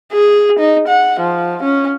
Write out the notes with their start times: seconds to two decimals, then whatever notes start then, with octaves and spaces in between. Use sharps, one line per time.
0.12 G#4
0.59 D#4
0.88 F#5
1.20 F3
1.63 C#4